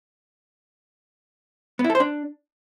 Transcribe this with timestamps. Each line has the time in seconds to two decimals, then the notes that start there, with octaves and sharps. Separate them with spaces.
1.79 B3
1.84 E4
1.90 A4
1.95 C5
2.00 D4